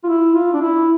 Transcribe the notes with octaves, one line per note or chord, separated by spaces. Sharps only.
F4
E4
F4
D4
E4